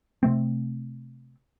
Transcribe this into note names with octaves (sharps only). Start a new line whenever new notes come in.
C3 A3 C4